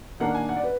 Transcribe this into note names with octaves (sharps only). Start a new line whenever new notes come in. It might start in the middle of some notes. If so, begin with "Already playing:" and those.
D#3 A#3 D4 F#5
G#5
F#5
D5
B4